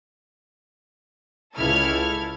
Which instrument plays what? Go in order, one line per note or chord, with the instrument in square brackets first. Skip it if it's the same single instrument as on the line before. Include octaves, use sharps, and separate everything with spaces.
[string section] C#2 E4 A4 F6 G#6